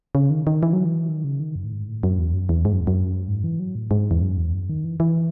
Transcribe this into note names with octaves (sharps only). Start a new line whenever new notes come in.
C#3
D#3
D#3
E3
F#3
E3
D#3
C#3
D#3
F#2
A2
G#2
A2
F#2
E2
F#2
E2
G#2
F#2
E2
F#2
G#2
E3
F#3
A2
G#2
E2
F#2
E2
F#2
D#3
E3
E3